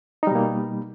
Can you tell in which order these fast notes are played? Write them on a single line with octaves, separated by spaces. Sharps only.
D#4 G3 B2 A#3